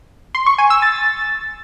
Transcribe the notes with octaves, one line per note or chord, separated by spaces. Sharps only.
C6
C#6
G#5
E6
A6